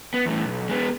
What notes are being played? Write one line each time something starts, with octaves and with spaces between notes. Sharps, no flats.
B3
E2 A2
B1
G#3 B3